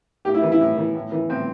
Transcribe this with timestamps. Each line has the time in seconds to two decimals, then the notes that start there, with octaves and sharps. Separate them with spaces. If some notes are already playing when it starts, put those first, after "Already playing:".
0.25 A2 G4
0.34 E4
0.42 E3
0.52 E4
0.60 A2
0.77 E3
0.95 A2
1.12 E3
1.29 A2 C4